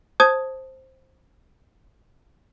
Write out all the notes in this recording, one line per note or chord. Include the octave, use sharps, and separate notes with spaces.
C5 A5 D#6 G#6